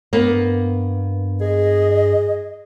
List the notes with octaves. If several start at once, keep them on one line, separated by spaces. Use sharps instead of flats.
G2 A#3 B3
G#4 D#5